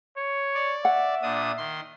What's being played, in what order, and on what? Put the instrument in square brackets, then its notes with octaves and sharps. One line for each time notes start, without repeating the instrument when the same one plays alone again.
[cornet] C#5
[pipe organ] D5
[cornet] E5 [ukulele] F#5
[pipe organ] A#2 D4 D#6
D#3 C6